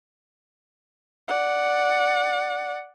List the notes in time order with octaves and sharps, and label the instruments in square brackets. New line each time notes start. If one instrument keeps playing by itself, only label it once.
[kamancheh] D5 F#5